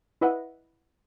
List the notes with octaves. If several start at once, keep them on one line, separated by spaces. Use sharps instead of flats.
E4 B4 D#5 E5 F#5